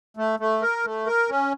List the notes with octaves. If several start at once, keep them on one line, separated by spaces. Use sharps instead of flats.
A3
A3
A#4
A3
A#4
C#4